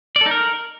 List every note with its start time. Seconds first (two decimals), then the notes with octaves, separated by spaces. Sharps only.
0.16 D5
0.21 A4
0.26 D#4
0.31 A#4